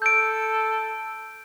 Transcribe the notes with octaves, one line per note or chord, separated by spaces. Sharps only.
A4 G6 D7